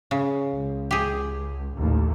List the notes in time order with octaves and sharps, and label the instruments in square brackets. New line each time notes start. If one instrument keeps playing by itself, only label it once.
[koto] C#3
[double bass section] C#2
[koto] G4 G#4
[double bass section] A1 D#2